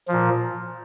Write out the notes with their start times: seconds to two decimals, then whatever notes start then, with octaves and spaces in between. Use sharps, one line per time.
0.08 A#2 F3